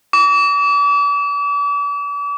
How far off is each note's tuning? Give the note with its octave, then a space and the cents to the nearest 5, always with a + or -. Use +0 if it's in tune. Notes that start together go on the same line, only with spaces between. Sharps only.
D6 -40